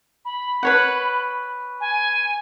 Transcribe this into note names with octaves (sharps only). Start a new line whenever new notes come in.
B5
B4 C#5 F#5
G#5